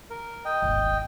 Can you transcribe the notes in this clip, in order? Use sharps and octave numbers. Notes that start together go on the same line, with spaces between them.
A#4
D#5 G5
D#1 G#1